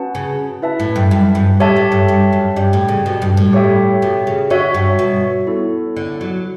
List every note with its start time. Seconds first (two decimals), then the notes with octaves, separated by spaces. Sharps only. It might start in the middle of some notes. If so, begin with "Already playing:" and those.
Already playing: C#4 F#4 B4 F#5 A5
0.15 C#3
0.62 E4 B4 E5 A5
0.80 A2
0.96 G2
1.11 F#2
1.35 G2
1.60 A2 G4 C#5 E5 A5
1.76 A2
1.92 G2
2.08 G2
2.33 F#2
2.56 G2 G4 D5 G5
2.73 A2
2.88 C#3
3.06 B2
3.22 G2
3.37 A2
3.53 G4 C#5 E5 G5
4.02 B2
4.27 C#3
4.50 D3 F#4 C#5 E5
4.74 G2
4.99 B2
5.47 B3 E4 A4 C#5
5.96 D3
6.21 F#3